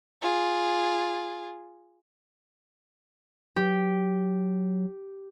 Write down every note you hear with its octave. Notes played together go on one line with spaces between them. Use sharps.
F4 G#4
F#3 G4